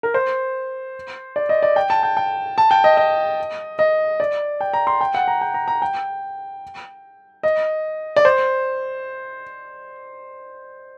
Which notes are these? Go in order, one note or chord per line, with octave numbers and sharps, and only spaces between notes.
A#4
C5
D5
D#5
D5
G5
A5
G5
G5
A5
G5
D#5
D#5
D#5
D5
G5
A#5
C6
G5
F#5
A#5
G5
A#5
A#5
G5
D#5
D5
C5